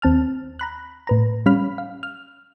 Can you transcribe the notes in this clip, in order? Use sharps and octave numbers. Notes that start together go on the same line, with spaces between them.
D#2 C4 A5 F6
A#5 B5 F#6
A2 B4 A#5
G3 C#4 F5 B5 F6
F5
F6